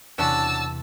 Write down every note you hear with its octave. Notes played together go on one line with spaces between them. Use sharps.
E2 C3 C#4 D4 F#4 A5 E6